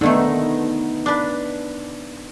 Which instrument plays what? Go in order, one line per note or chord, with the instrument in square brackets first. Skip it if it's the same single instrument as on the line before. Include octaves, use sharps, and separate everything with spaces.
[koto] D3 D#3 A3 [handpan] B3 D#4
[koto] D4 B4